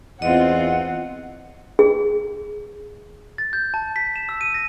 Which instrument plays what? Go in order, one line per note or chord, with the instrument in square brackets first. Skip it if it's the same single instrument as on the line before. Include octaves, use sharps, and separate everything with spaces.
[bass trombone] E2 [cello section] C4 F4 [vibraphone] D#5 [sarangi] F#5
[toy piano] G#4
[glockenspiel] A6
G6
A5
B6
E7
E6
D#7
A#6